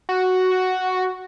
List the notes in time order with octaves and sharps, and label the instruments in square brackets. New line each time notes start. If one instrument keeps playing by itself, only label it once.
[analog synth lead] F#4